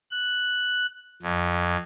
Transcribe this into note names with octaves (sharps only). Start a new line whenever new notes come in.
F#6
F2